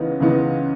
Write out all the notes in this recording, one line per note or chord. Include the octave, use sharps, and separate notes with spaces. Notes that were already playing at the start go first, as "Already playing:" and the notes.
Already playing: C#2 C#3 E3 B3 D#4
C#2 C#3 E3 B3 D#4